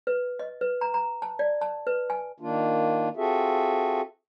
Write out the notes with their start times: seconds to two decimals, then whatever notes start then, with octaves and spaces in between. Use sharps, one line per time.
0.07 B4
0.39 D#5
0.61 B4
0.81 A#5
0.94 A#5
1.22 A5
1.39 D5
1.61 A5
1.87 B4
2.10 G#5
2.40 D#3 A#3 D4 F4
3.16 C4 F4 F#4 G#4 A4 E5